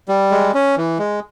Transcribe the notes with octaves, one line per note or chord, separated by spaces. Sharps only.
G3
G#3
C#4
E3
G#3